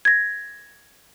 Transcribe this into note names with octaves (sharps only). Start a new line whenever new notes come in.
G#6 A#6